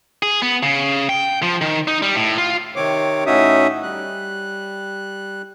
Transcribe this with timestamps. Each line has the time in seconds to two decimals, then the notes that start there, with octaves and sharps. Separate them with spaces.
0.23 G#4
0.42 B3
0.63 C#3
1.09 G5
1.43 F3
1.61 D#3
1.88 D#4
2.02 G3
2.15 A2
2.38 F4
2.76 C3 D#3 C4 C#5 D6
3.26 A2 C#4 D#4 F#4 E5 D#6
3.83 G3 F#6